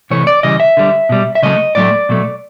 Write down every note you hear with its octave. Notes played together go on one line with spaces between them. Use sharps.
C3 E3 A3 C#5
D5
C#3 E3 G3 D#5
E5
D3 G3
B2 G3
E5
C#3 F#3 A3 D#5
A2 F#3 A3 D5
B2 F#3 A3